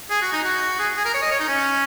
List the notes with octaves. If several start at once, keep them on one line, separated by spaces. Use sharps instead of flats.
G#4
F#4
D#4
F#4
G#4
G#4
A#4
C#5
D#5
C#5
D#4
C#4